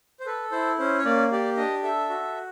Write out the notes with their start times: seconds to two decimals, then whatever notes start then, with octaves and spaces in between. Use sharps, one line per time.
0.20 C5
0.26 A4 B4
0.51 E4 C5
0.79 C#4 C5
0.98 C#5
1.05 A#3 D5
1.32 G4 D5
1.57 D4 D#5
1.83 A4 E5
2.09 F#4